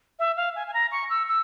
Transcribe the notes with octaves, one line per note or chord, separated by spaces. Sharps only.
E5
F5
G#5
G#5
A#5
C#6
E6
E6